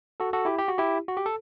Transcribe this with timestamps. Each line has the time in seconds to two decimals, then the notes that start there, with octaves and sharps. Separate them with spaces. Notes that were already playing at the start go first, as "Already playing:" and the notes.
0.20 F#4 A4
0.33 F#4 A4
0.45 E4 G4
0.59 G4
0.68 F#4
0.78 E4 G4
1.08 F#4
1.17 G4
1.26 A4